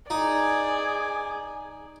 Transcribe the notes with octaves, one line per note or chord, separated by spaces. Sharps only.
D#4 G#4 D5